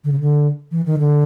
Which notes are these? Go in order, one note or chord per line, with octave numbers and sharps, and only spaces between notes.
D3
C#3
D3
E3
D#3
D3